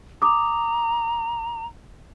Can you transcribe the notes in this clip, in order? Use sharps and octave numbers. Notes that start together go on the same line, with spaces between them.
A#5 D6 D#6